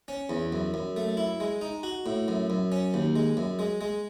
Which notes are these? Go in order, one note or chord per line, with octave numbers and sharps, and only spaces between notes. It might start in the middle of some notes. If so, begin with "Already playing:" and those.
C#4
E2
F#2
F#2
A3
E4
G#3
D#4
F#4
A2
F#2
F#2
C#4
D#2
G#3
F#2
G#3
G#3